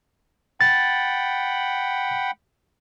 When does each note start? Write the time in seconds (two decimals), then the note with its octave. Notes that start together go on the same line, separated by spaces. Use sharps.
0.61 F#5 G5 B5 A6